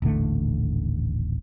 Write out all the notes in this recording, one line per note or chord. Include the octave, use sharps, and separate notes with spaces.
D#1 A1 D3 A3